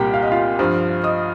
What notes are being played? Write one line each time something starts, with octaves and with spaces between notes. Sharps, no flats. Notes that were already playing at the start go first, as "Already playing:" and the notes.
Already playing: C2 A#2 G3 G4 A#4 G5 A#5
F5
D#5
F4 F5
G2 F3
D#5 D#6